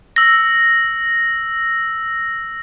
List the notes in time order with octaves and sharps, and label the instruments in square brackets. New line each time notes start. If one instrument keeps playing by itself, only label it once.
[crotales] E6 A#6